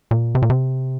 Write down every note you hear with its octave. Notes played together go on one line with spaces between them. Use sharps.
A#2
C3
A#2
C3